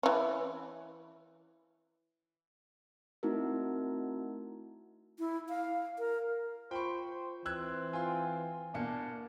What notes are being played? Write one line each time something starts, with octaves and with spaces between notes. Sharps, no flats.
E3 C#4
A3 C4 D#4 E4 F#4 A#4
E4
F5
A#4
F4 C5 G5 B5 C#6
C5
E3 C4 E6 F#6 G#6
F4 G#5 C6
B2 A#3 D4 C#7